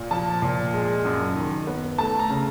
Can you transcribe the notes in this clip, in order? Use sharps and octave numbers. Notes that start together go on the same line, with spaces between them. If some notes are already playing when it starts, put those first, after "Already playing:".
Already playing: A#2 A#3
F3 A5
A#2
G#3
F#2
D#3
B3
A3 A5
A#5
C#3